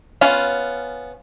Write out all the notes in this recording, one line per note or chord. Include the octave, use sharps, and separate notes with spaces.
B3 C#4 F4